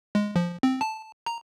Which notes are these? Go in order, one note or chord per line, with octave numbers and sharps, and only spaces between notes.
G#3
F3
C4
A5
A#5